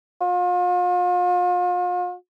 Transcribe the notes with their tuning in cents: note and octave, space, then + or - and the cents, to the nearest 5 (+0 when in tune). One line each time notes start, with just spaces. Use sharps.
F4 +40